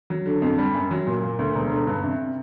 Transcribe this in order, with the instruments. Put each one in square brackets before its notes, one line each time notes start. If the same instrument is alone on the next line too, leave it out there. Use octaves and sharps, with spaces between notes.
[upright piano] F#3
D3
F2
G3
F#2
F#3
A#2
A#3
D2
E1
D3
G2
C3